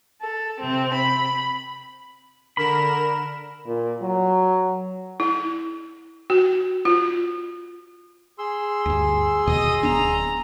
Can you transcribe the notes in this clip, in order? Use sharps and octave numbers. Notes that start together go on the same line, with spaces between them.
A4
C3 C4
B5
D3 A#4 B5 E7
A#2
F#3
E4
F#4
F4
G#4 C6 E6
D2 G2
D#2 B2 D#5 D#6
D1 B3 D4 A#5